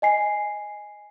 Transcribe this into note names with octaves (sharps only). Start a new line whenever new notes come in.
D#5 G#5 C7